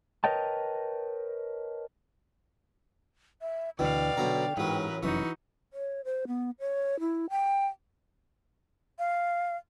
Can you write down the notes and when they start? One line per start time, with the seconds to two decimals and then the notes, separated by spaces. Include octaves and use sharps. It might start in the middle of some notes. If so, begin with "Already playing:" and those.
0.24 A#4 B4 C#5 D#5 G5 A5
3.42 E5
3.79 D2 B2 D3 E3 D5 F5 G5
4.17 B1 B2 D3 A#5
4.57 A1 G#2 F#3 A#4 B4
5.03 F1 F#2 E3 D#4 F#4
5.72 C#5
6.05 C5
6.27 B3
6.60 C#5
7.00 E4
7.30 G5
8.99 F5